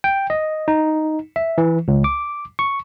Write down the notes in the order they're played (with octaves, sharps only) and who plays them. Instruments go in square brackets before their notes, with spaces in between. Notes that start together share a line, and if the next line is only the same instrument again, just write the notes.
[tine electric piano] G5
D#5
D#4
E5
E3
C#2
D6
C#6